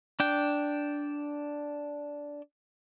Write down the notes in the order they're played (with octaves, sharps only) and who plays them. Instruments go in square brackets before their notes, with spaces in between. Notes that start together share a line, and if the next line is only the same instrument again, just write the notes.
[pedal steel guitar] D4 G5